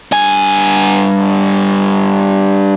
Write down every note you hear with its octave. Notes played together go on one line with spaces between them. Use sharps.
G2 G#5